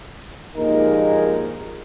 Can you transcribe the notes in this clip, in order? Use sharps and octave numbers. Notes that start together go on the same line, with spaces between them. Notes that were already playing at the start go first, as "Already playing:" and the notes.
A#1 D#2 G#3 D#4 A#4